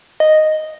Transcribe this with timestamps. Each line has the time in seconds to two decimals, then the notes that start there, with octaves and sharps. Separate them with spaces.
0.20 D#5